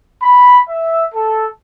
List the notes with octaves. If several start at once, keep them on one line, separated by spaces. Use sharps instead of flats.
B5
E5
A4